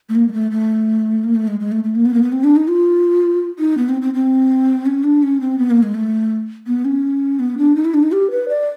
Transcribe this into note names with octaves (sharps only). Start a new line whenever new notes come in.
A3
A#3
G#3
A3
A3
A#3
A3
G#3
G#3
A3
A3
A#3
B3
A#3
B3
C4
D4
D#4
F4
D#4
B3
C4
C4
C4
C#4
D4
C#4
C4
B3
A#3
G#3
A3
B3
C#4
B3
D4
D#4
E4
D4
D#4
G4
B4
D5